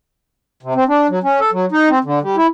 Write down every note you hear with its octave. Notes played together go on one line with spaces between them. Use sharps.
C3
C4
D4
F#3
C#4
A4
F#3
D#4
C4
D3
G3
E4